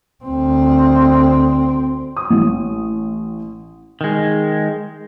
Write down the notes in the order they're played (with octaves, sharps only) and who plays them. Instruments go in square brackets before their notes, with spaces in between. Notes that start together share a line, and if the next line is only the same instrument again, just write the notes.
[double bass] D2 C4
[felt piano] D#6
A1
[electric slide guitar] D#3 G#3